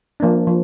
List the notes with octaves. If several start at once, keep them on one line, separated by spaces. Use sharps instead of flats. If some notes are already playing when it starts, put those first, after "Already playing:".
F3 A#3 D4
F3